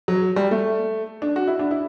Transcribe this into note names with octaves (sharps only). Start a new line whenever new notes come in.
F#3
G3
A3
D4
F#4
E4
D4
E4